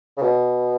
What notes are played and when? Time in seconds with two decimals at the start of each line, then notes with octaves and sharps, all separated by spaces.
0.17 C#3
0.22 B2